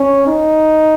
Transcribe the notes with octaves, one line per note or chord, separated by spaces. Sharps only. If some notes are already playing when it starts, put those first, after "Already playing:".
Already playing: C#4
D#4